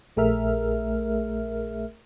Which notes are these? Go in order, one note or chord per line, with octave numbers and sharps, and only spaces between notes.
A#1 A3 G#4 A#4 E5 F6